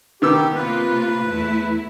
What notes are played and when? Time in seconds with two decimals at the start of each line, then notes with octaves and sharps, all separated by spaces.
0.22 D#3 B3 G4 E6
0.55 C3 A#3 F4 B4
1.28 E2 A3 E4